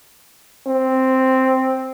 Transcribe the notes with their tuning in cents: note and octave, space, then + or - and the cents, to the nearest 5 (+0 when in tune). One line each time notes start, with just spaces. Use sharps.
C4 +0